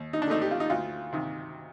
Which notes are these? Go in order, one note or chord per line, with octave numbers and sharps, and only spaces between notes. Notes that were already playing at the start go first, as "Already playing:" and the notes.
Already playing: D#2
D#4
D4
D3 A3 C4 D#4
G4
F4
D#4
D2 F4
C3 D#3